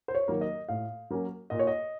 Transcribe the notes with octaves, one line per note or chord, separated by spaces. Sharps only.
C5
C#5
D#3 F#3 A#3
D#5
A2 F5
F#3 A#3 C#4
A#2 D#5
C#5
D#5